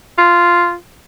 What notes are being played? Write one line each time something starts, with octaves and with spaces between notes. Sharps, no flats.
F4